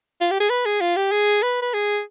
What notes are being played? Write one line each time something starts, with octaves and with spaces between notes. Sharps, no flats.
F4
G4
G#4
B4
G#4
F4
G4
G#4
B4
B4
G#4